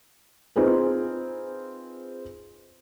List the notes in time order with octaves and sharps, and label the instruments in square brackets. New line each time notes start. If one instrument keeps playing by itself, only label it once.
[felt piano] C4 D#4 F4 G#4 B4